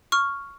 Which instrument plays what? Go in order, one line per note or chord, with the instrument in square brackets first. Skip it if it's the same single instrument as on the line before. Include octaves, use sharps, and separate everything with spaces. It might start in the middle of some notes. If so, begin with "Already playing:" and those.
[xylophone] C#6 F6